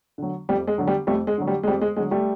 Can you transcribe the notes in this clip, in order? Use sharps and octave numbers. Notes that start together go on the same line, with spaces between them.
D3 F#3
F2 G3
G#3
D3 F#3
G3
F2 G3 A3
G#3
D3 F#3
G3
G#3
F2 G3
G#3
D3 F#3 G#3
G3 A3